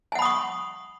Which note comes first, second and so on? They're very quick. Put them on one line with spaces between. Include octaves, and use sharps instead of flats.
G#5 F#5 B5 D#6 C#6